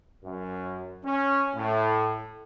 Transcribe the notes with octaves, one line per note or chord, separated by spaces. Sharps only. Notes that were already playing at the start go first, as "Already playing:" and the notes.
F#2
C#4
A2